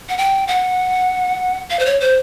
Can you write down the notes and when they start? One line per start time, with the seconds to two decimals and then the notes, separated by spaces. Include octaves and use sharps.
0.09 F#5
0.18 G5
0.48 F#5
1.70 F5
1.79 C5
1.86 C#5
2.00 C5